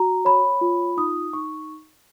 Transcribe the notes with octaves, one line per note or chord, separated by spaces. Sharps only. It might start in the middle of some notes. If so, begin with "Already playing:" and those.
Already playing: F#4 A#5
C#5 B5
F4
D#4 D#6
D#4 C#6